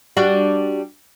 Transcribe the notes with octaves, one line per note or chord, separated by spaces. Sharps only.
G3 D4 F#4